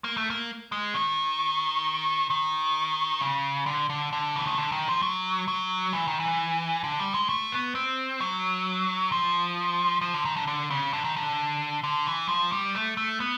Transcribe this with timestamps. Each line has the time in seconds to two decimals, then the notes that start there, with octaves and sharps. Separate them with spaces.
0.04 A#3
0.17 A3
0.30 A#3
0.72 G#3
0.94 D#3
2.30 D#3
3.21 C#3
3.66 D3
3.90 D3
4.13 D3
4.36 E3
4.46 D#3
4.58 D3
4.72 D#3
4.88 F3
5.02 F#3
5.48 F#3
5.93 E3
6.08 D#3
6.20 E3
6.84 D3
7.00 G3
7.14 G#3
7.29 A3
7.52 B3
7.75 C4
8.20 F#3
9.12 F3
10.01 F3
10.14 D3
10.25 D#3
10.36 D3
10.47 D3
10.70 C#3
10.93 D3
11.04 D#3
11.16 D3
11.84 D3
12.07 E3
12.28 F3
12.52 G3
12.75 A3
12.97 A3
13.20 B3